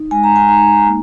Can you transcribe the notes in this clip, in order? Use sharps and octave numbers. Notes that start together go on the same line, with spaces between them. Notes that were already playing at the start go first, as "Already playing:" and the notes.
Already playing: D#4
G#3 G#5
A#5
G#5
D#4 A#5
A#3